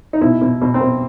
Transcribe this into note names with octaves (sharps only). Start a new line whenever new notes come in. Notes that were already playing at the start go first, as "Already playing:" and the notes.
D#4
B2 E4
B2
B2
C4
B2